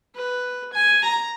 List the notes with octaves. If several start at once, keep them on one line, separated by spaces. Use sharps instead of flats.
B4
G#5
A#5